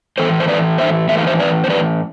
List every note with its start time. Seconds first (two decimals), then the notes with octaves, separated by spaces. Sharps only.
0.18 A2 E3 A3 A4 C5
0.40 C5
0.48 B4 D5
0.78 C5 E5
1.09 A2 E3 A3 E5
1.18 F5
1.27 C5 E5
1.40 B4 D5
1.64 C5
1.70 B4 D5